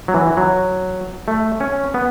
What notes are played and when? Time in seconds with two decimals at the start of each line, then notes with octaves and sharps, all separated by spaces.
0.08 F#3
0.14 E3
0.37 F#3
1.28 A3
1.60 C#4
1.94 B3